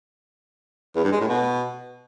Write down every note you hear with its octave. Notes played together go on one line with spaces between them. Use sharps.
E2
G2
G#3
A2
B2